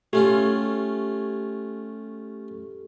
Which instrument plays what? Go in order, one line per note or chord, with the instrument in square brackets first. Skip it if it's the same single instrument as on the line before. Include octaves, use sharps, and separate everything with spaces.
[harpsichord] A3 C#4 F4 [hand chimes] G4